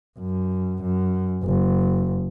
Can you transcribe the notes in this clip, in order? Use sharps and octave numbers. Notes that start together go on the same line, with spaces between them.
F#2
F#2
F#1